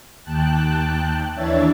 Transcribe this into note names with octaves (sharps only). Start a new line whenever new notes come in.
D#2 G5 A5 F#6
D#2 E3 D4 C#5 E5 A6